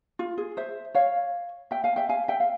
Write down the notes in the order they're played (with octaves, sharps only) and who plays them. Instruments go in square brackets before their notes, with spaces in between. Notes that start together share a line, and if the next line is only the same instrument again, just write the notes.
[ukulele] F4
G#4
C5 E5
C#5 F5
E5 G5
F5 G#5
E5 G5
F5 G#5
E5 G5
F5